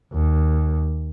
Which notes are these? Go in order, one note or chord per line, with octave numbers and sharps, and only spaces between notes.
D#2